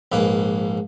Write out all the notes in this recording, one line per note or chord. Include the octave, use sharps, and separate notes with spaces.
A#1 G#2 A#3 B4